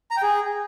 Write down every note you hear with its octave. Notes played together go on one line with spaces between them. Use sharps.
A#5
G5
G#4